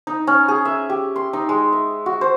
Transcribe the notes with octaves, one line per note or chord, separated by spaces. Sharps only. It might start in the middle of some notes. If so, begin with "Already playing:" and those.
D#4
C#4
G#4
E5
G4
C6
D#4
G#3
E5
F#4
C5